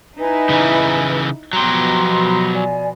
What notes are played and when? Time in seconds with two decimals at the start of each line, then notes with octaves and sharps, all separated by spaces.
0.19 D#4 E4 B4 G#5
0.50 C#3 E3
1.53 B2 F3 F#3 G4 A#5 C6
2.53 D5 G#5